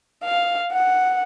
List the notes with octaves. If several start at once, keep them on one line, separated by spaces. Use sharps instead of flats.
F5
F#5